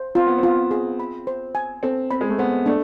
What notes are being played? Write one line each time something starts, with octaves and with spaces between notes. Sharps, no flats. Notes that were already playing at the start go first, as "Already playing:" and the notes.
Already playing: C5
C4 F4
B3
C4
F4
G#4
B5
C5
G#5
C4 A4
C4 B5
G#3
A3
B3 C5
A3 D4